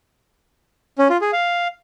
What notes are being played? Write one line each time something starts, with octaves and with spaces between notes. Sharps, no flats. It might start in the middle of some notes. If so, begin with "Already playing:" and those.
C#4
F4
G#4
F5